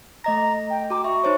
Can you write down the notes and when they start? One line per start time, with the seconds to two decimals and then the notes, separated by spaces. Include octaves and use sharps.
0.24 A3 D#5 A#5 A#6
0.70 G5
0.90 F#4 A#5 D6
1.04 E5 C#6
1.24 D#4 C5 C#5